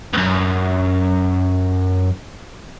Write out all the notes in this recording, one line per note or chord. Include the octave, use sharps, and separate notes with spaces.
C#2 F#2